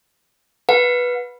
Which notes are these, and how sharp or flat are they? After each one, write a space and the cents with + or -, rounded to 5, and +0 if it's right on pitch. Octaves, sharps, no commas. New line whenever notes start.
B4 -10 F#5 -40